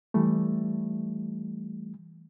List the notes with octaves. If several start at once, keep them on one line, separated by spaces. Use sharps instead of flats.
E3 G3 A3